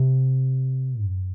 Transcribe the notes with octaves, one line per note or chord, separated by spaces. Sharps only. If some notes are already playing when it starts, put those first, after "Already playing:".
Already playing: C3
F#2